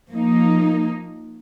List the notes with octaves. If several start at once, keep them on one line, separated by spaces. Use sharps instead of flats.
F3 A#3 D#4